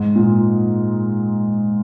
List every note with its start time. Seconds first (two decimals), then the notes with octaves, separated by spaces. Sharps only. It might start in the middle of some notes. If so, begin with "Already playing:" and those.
Already playing: G#2
0.15 A#2